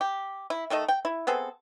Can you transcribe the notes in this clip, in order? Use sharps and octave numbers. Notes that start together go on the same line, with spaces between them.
G4
E4
D#3 A3 A4 D#5
G5
E4
B3 C4 G#4 A4